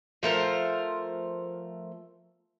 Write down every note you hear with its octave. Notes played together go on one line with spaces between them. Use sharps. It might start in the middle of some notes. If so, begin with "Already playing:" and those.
F3 A3 A#4 C5